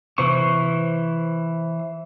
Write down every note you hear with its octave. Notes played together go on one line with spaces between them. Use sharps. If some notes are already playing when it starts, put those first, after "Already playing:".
C3 E3 B3 C5 C#6